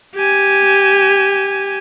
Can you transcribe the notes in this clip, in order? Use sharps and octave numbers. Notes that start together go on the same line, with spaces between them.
G4 G#5